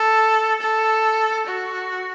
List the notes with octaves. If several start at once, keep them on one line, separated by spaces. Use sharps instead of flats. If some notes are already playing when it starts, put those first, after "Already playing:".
Already playing: A4
A4
F#4